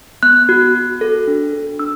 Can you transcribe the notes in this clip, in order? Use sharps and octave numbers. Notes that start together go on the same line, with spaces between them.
B3 F#6
F#4
F#4
A4
D4
A4
D4 E6